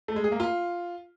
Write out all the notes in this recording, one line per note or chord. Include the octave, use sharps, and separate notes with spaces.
A3
G#3
G#4
A#3
F4